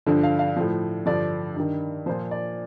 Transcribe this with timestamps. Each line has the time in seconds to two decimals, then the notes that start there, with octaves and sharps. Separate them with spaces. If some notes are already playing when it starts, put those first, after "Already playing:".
0.06 G2 D3 F3
0.23 F5
0.39 F5
0.56 A2 F3
1.06 G2 D3 F3 D5
1.56 G2 D#3
2.06 F3 C5
2.09 A#2
2.31 D5